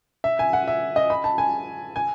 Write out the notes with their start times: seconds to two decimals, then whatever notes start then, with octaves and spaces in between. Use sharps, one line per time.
0.24 E5
0.39 G#5
0.53 F#5
0.68 E5
0.96 D#5
1.10 B5
1.24 A5
1.38 G#5
1.96 G#5